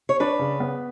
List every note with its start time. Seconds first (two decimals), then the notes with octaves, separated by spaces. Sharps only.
0.09 C#5
0.20 D4 B4
0.39 C#3
0.60 B3